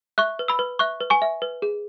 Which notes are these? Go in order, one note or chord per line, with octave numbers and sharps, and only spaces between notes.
E5 C#6 F#6
B4
B5 E6
B4
E5 C#6 F#6
B4
G#5 C#6
E5
B4
G#4